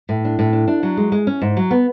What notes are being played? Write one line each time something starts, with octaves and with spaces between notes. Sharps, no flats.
A2
D4
A2
D4
D4
F#3
G#3
G#3
C#4
G#2
F#3
B3